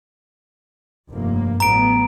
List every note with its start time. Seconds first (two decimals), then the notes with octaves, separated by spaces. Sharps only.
1.10 F1 G2 A#3
1.60 A1 F#3 B3 A#5 D7